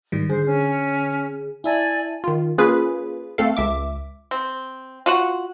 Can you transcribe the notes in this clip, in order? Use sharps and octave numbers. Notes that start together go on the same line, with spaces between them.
G#2 D#3 G3
D3 G#4 C5
C#4
E4 D5 E5 G#5 A5
D#3 F4
A#3 C#4 F4 G#4 B4
A3 C4 A4 F5
C#2 E5 D6
C4
F4 F#4 F#5